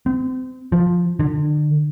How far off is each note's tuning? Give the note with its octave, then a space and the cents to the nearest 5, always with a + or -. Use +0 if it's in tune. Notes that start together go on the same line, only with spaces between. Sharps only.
C4 -35
F3 +10
D3 +35